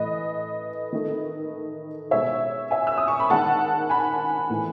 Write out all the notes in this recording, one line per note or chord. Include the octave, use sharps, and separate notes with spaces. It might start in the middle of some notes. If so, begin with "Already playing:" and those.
Already playing: A2 E3 A3 B4 D#5
D#3 A3
B2 G#3 C#5 E5
E5 G#5
E6
D#6
C#6
B5
D#3 G#3 F#5 A5
G#5 B5
A2 E3 A3